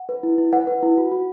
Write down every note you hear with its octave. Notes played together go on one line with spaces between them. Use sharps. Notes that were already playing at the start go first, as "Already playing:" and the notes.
Already playing: F#5
B4
E4
E4
B4 F#5
B4
E4
F#4
F#4